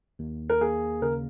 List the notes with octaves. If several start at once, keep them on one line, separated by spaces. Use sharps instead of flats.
D#2
A#4
A#3 G#4
C#3 A#4